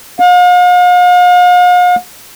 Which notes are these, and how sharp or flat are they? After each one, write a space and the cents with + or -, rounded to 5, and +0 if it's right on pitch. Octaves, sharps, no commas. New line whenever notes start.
F5 +45